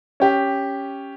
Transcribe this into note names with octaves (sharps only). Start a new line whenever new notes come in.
C#4 G4